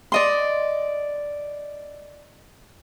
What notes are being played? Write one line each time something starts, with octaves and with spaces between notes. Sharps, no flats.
D5 D#5 C6